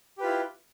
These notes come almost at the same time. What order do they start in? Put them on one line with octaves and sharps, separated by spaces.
G4 B4 F4 E4